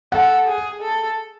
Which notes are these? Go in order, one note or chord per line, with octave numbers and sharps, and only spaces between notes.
A4 F#5
G#4
A4